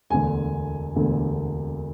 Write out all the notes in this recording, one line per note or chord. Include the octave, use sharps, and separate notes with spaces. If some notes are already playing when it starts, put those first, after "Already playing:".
E1 D2 D3 G#5
E1 D2 D3